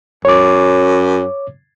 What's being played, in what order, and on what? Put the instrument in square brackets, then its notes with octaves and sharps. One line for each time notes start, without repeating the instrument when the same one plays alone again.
[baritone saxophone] F#2 [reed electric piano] C#5 D6